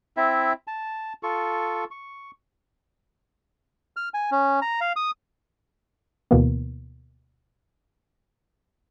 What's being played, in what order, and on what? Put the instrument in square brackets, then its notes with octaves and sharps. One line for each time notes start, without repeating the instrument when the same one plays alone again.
[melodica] C4 E4 E5
A5
F4 A4 C#6
C#6
[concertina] F6
G#5
C#4
A#5
F5
D#6
[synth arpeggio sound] D2 B2 E3 A#3 B3